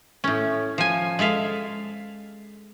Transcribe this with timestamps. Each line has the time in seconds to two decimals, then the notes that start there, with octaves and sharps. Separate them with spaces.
0.24 A2 C#4
0.78 F3 G#5
1.19 G#3 A4 E5 F5